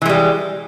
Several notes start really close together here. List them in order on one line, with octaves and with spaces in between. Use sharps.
E3 G#3 G3